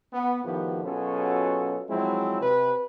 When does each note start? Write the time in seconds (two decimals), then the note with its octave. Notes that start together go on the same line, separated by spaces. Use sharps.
0.13 B3
0.43 A2 D#3 F3 B3 F#4 G4
0.83 B2 F#3 C#4 F4 G#4 A4
1.88 F3 F#3 G#3 C4 E4
2.40 C3 B4